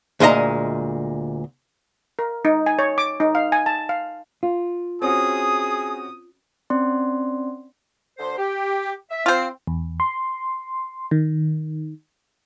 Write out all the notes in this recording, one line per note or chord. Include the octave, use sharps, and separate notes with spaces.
D2 A#2 G#3 D#5 A#5
A#4
D#4
G#5
C#5
D6
D#4
F5
G#5
A5
F5
F4
C4 C#4 F#4 G#4 D#6
C4 C#4 D5 C6
D2 C5
G4
E5
C4 F4 C5
E2
C6
D#3